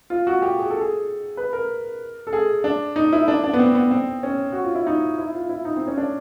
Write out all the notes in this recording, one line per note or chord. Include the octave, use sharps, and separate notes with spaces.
F4
F#4
G4
G#4
A4
G#4
B4
A#4
A4
G#4
D4
D#4
E4
D4
D4
B3
C4
B3
C4
C#4
F#4
F4
E4
D#4
E4
F4
E4
D#4
C4
C#4
D4